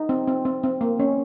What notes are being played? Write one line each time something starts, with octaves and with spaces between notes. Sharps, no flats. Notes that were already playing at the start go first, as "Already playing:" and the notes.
Already playing: D#4
C4
C4
C4
C4
A#3
C#4